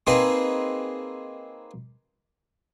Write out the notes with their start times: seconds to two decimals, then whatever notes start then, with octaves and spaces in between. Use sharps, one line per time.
0.07 A#3 C4 D#4 G#4 A#4 B4